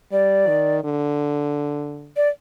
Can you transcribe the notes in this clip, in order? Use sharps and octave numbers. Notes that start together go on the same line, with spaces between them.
G3 D5
D#3
D3
D5